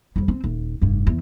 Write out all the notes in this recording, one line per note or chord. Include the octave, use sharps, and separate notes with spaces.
F2 G3
C4
D#1
F1 G2
E2